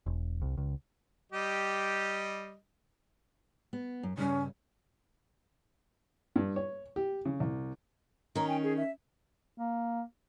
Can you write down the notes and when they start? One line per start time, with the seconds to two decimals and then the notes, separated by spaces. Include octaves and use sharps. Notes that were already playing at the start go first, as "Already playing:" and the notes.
0.06 E1
0.42 C2
0.58 C#2
1.32 G3 G4 D#5
3.73 B3
4.03 F#2
4.17 G2 C#3 C#4
6.36 G2
6.56 C#5
6.96 G4
7.25 C#3
7.40 C2
8.35 D#3 C#4 A#5
8.48 G5 G#5
8.61 G#4
8.77 E5
9.58 A#3